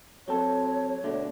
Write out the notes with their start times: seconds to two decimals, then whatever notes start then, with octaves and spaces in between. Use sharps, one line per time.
0.28 F#3 C4 A4 C#5
1.04 B2 D3 A3